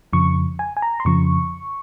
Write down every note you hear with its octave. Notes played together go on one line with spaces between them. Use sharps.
F2 C#3 F3 C#6
G#5
G#5
A#5
C6
F2 C#3 F3 C#6